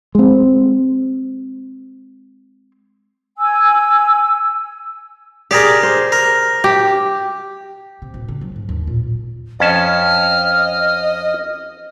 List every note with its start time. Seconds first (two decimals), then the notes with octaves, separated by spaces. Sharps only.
0.15 G#3 C4
3.37 G#5 E6
5.51 G4 G#4 A#4 D5
5.83 C5
6.12 A#4
6.64 G4
8.02 C3
8.14 D1
8.29 C#3
8.41 F#3
8.56 G#2
8.69 D#2
8.87 A#2
9.60 F2 C#4 D#5 A5 F6